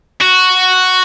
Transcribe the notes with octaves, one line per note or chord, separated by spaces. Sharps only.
F#4